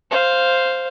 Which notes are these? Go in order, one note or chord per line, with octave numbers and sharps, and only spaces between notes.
C5 F5